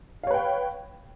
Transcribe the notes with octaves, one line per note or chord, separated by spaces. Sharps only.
B4 C#5 F5 G5